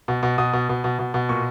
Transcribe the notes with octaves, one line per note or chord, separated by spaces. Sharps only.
B2
B2
B2 D#6
B2
B2
B2
B2
B2
A#2 C#6